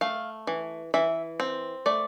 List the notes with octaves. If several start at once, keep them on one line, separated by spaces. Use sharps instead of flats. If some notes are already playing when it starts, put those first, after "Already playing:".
A3 F5
E3
E3 E5
C4
A3 D5